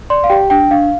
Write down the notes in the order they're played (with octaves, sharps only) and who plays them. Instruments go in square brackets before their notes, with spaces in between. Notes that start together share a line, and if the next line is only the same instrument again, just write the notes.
[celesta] D5 C6
F5
G4 G5
D4 G5
D4 F5